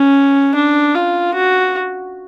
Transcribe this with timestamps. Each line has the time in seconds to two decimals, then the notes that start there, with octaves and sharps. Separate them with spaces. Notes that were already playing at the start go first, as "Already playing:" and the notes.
Already playing: C#4
0.55 D4
0.95 F4
1.35 F#4